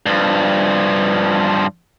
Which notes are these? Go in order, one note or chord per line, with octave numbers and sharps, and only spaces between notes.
G2 F3